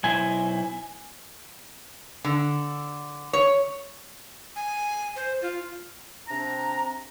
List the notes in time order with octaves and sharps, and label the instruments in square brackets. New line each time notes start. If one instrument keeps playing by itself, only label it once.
[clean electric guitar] B1 E4 C5 [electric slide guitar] G#5
[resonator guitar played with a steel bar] D3
C#5
[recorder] G#5
C5
F4
[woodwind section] C3 C4 D4 A#5